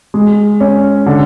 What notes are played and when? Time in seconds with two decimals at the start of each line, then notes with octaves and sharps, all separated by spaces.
0.14 G#3
0.60 C#4
1.06 D3